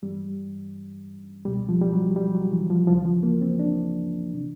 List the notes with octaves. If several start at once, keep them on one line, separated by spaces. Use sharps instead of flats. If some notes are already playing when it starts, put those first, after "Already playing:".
G2 E3 G3
C#2 B2 G3
F3
G3
F#3
G3
F#3
E3
F3
D2 C#3 E3 F3
F3
A#3
C4
D4
C3 E3